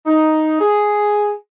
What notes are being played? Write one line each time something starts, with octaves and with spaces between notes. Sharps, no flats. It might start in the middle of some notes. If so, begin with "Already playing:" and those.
D#4
G#4